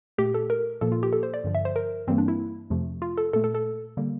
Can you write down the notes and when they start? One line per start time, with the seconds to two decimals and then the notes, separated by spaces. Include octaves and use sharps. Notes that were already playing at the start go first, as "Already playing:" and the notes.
0.18 A#2 A3 G4
0.34 A4
0.50 A#4
0.81 A#2 F3 A#3 A4
0.92 F4
1.03 G4
1.13 A4
1.23 C5
1.34 D5
1.44 G2 D3 F3
1.55 E5
1.65 C5
1.76 A#4
2.08 G2 E3 G3 A#3 C4
2.18 D4
2.28 E4
2.70 F2 C3 F3 A3
3.02 F4
3.18 A4
3.33 A#2 A3 A4
3.44 A4
3.55 A4
3.97 D3 G3 A#3